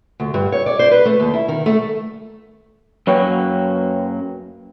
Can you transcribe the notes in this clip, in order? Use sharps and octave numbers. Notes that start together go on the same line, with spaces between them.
D2
G2
C#5
D5
C5
B4
A3
D#2
E4
D#3
A3
F#2 F#3 A#3 B4 C#5 G5